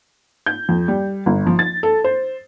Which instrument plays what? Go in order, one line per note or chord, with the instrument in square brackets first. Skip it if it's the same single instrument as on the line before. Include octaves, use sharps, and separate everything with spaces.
[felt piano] G6
F2
G3
G1
F3
A6
A4
C5